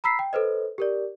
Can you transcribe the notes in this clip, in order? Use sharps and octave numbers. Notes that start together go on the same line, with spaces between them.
A#5 B5 E6 B6 C7
G5
A4 B4 C5 D#5
G4 A#4 D5